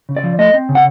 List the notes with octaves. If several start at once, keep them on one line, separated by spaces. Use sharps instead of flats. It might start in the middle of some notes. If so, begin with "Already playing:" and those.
C#3
D5
F3
A3 D#5
C4
C#3
F#5